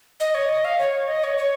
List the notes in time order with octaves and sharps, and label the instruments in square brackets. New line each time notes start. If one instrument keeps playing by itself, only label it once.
[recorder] D#5
C#5
D#5
F5
C#5
D#5
C#5
C#5